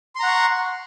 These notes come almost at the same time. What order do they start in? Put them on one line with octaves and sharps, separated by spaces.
C6 A#5 F#5 C#6